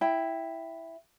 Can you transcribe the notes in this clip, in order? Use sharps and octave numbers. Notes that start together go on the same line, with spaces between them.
E4 G5